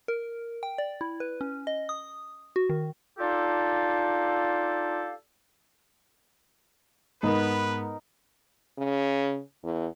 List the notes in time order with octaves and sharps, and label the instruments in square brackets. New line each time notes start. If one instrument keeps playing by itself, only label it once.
[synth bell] A#4
G5
D5
E4
B4
C#4
D#5
D#6
F#4
D#3
[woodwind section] D4 D#4 F4 G4 A4 F5
[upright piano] G#2 [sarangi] B3 [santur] D#4 A#4 [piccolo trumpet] B4
[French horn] C#3
E2